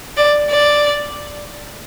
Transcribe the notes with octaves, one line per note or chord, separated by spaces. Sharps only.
D5
D5